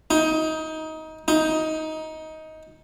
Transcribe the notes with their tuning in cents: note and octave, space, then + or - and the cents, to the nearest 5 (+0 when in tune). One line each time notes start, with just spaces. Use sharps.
D#4 +20
D#4 +15